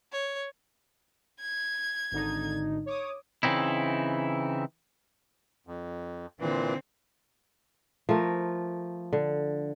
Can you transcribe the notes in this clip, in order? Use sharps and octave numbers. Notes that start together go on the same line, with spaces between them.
C#5
G#6
G#1 D3 D#4
C#5 D6 D#6
C#3 E3 C4 D#4 E4
F2
A#2 D3 E3 C4
F3 A3 A#4
D3